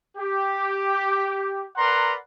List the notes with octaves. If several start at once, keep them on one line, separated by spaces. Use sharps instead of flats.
G4
A#4 B4 D5 F#5 A#5 C6